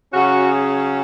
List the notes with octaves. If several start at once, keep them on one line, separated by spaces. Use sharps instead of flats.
C#3 F#3 C#4 F#4
G#4